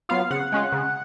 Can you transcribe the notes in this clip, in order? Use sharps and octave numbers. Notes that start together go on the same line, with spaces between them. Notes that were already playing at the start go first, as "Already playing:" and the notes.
F#3 B3 F4 F5
C#3 F#5
G#3 C#4 F4
C#3